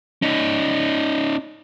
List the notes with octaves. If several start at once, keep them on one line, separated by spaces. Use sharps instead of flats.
C#4 D#4